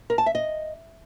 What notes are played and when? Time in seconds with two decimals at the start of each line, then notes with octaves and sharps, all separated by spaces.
0.10 A#4
0.18 A5
0.26 E5
0.35 D#5